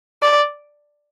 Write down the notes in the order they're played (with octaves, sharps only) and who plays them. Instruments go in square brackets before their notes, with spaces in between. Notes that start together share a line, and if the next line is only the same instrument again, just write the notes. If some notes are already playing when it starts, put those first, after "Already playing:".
[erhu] D5